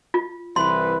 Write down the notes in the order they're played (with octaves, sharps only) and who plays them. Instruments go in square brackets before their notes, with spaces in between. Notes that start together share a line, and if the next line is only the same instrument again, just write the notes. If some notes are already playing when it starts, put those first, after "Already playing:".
[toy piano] F4
[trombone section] C2 E3 B4 [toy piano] C6